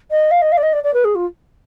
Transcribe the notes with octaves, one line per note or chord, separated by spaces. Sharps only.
D#5
F5
D#5
F5
D5
D#5
D5
D5
B4
G#4
F4